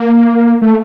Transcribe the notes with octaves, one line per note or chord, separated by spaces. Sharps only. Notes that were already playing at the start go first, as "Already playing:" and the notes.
Already playing: A#3
A3